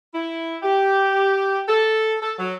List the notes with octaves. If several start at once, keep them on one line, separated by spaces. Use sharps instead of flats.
E4
G4
A4
A4
F#3